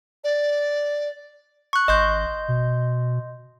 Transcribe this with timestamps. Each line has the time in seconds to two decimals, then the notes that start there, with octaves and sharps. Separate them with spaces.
0.24 D5
1.73 C#6 F#6
1.88 G#1 D#5 C6 G6
2.48 B2